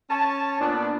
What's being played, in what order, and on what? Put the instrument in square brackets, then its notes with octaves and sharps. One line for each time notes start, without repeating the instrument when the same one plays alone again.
[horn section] C#4 C#5 A5
A#2 B3 D4